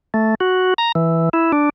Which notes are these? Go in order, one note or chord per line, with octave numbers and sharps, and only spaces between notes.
A3
F#4
A#5
E3
E4
D4